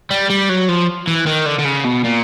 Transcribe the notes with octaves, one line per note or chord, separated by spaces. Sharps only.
G3
G3
F#3
F3
E3
D#3
D3
D3
C#3
B2
A#2